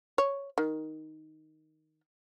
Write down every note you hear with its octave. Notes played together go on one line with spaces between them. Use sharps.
C#5
D#3